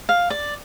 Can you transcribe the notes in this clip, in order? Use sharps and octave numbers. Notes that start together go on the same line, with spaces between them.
F5
D5